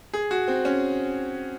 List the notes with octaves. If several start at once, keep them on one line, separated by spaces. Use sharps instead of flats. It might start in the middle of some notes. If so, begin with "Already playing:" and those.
G#4
F#4
C4
C#4